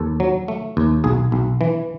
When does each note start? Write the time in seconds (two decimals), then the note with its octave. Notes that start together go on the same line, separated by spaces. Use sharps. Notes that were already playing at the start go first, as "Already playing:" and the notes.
Already playing: D#2 A4
0.20 F#3
0.48 A3
0.77 D#2
1.04 B1 G#4
1.32 B1
1.61 E3